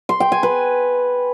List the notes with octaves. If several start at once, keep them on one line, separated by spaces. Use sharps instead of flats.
C6
G5
G#5
B4